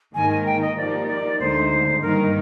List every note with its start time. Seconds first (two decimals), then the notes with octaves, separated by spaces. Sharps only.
0.14 G#2 D#3 A#3 D#4 A#4 G#5
0.30 G#5
0.45 G5
0.61 D#5
0.76 F3 A#3 D#4 G4 A#4 D5
1.07 D5
1.39 D2 D3 G#3 D#4 C5
2.01 G2 D#3 A#3 D#4 A#4